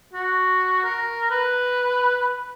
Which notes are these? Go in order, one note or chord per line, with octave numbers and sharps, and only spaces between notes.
F#4
A#4
B4